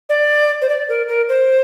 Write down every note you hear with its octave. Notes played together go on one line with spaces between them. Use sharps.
D5
C5
D5
A#4
A#4
C5